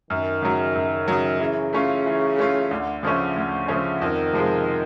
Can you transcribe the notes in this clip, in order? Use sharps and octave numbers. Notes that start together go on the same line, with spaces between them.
F#2 D#3
C#3 F#3
F#2
C#3 F#3
C#3 E3
A3 C#4 F4
E3
A3 C#4 F4
D2 D3
C#3 F3 A3 C#4
D2
C#3 F3 A3 C#4
F2 D#3
C3 F3 G#3